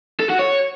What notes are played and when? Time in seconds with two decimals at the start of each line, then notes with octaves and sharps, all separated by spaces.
0.20 A4
0.29 F#4
0.39 C#5